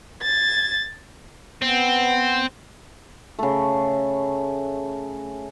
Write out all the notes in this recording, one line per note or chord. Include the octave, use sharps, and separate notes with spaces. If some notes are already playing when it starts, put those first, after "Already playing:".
G#6 A6
B3 C4
C#3 A3